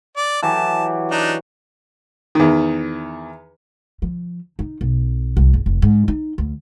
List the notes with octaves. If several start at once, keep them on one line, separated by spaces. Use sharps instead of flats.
D5
E3 F#3 G4 A5
D4 D#4 F#5
E2 D#3
F3
D#4
B1
C2
F#1
F1
G#2
D#4
D2